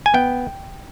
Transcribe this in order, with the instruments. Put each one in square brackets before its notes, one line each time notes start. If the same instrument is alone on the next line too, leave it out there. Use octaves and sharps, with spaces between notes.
[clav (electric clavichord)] G#5
B3 G5